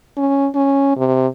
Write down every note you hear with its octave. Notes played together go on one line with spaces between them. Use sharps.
C#4
C#4
C3